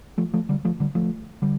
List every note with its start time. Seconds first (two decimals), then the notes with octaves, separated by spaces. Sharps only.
0.18 F3 A3
0.34 F3 A3
0.49 D3 G3
0.65 F3 A3
0.80 D3 G3
0.95 F3 A3
1.42 D3 G3